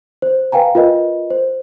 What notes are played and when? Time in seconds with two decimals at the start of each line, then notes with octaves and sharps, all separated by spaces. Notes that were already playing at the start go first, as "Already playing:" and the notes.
0.22 C5
0.52 B4 F5 G5 G#5 A#5
0.75 F4 A#4 B4 D#5
1.30 C5